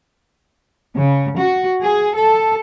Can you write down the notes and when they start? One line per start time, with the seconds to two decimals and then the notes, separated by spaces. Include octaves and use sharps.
0.96 C#3
1.38 F#4
1.82 G#4
2.14 A4